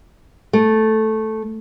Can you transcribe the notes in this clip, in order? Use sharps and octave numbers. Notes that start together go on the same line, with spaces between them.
A3